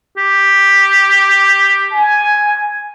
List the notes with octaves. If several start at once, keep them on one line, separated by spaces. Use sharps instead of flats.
G4
G#5